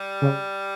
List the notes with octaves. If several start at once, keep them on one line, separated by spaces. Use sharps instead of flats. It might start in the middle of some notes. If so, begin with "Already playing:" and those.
Already playing: G3
C#3